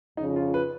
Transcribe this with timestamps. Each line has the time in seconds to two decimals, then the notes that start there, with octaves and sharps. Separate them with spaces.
0.17 F2 C#3 F3 D#4
0.36 F4
0.54 B4